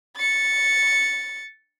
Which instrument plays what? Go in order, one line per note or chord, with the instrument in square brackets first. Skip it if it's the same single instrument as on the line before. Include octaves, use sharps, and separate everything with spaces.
[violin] A6 C#7